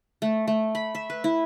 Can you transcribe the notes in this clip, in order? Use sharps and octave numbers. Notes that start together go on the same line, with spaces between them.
A3
A3
B5
E5
B4
E4